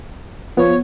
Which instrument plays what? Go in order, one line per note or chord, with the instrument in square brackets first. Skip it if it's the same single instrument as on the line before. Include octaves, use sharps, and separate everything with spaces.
[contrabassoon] F3 [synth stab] B3 [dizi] C#5